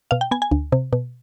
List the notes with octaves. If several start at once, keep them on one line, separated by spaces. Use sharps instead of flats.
B2 F5
G5
B3 G#5
G#5
D2
C3
B2